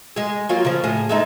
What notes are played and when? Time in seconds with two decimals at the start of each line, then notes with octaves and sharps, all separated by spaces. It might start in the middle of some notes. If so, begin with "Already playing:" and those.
0.16 G#3 G#4
0.49 F#3 A#3 F4
0.65 C#3 F3
0.84 A2 G#4
1.09 G#3 A3 D#4